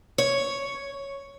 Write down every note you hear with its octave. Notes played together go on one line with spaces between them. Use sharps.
C#5